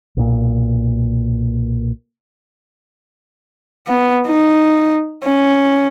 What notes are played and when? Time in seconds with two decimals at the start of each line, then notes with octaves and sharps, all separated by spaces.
0.17 B1 A#2
3.88 B3
4.28 D#4
5.24 C#4